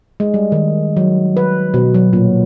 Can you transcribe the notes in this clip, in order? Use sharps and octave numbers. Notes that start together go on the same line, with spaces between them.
G#3
G3
D#3
F#3
B4
B2
F#3
A#2